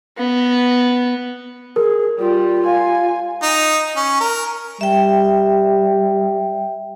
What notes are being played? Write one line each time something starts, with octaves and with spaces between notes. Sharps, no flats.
B3
G#4 A#4
G3 F4
F5 G#5
D#4
C#4
A#4
G3 E5 G5